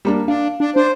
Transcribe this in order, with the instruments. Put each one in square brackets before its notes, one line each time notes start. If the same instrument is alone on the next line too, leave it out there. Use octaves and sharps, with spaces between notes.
[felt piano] G3 A#3 D4
[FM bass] D4 [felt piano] F5
[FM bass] D4
[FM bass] D4 [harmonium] C5